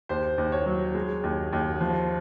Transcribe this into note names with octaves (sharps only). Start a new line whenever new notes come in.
D#2 C5
D#2
C#5
F#3
G#3
D#2
D#2
F3